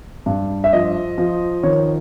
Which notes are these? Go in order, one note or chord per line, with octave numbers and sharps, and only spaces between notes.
G2
E5
F3 D#5
F3
D#3 C#5